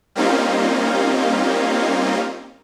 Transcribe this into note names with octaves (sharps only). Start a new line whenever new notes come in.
G3 A#3 C4 C#4 D#4 F4